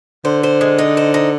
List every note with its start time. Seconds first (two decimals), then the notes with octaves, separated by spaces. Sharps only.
0.25 D3 C5
0.43 C5
0.61 G#3
0.78 D#4
0.97 C5
1.14 D#4